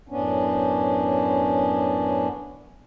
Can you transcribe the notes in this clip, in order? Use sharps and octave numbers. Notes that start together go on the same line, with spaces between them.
F#2 A2 B3 C#4 D4